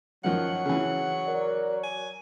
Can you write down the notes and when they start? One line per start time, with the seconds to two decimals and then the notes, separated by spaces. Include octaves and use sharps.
0.24 F#2 D#3 F3 F#3 F#5
0.66 C#3 E3
1.28 A#4 D5
1.83 G#5